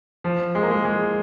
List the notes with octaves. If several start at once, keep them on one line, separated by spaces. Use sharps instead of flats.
F3
G#3
A#3
G#3
G#3